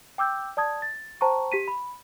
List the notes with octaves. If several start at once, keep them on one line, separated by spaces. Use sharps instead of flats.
G5 D6 E6 G6
D5 A5 D#6 G#6
A6
C5 G5 A5 A#5 C#6
G4 B6 D#7
B5